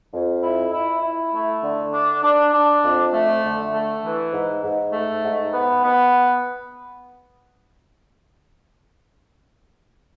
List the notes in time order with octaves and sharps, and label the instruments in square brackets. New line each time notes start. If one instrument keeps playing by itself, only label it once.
[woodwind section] F2
E4
E4
E4
A3
D3
D4
D4
D4
F2
A3
D3
A3
E3
G#2
G#2
A3
G#2
B3
B3